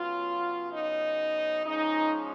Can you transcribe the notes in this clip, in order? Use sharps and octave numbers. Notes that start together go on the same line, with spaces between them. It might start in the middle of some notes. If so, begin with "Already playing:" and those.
Already playing: C#3 F#3 B3 F4
D#4
F3 G#3 C#4 D#4